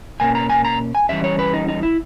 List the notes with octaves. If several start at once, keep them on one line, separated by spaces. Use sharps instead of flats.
B2 A#3 C#4 G#5
A#5
G#5
A#5
G#5
E3 G3 C#4 E5
C#5
B4
D#4
D#4
E4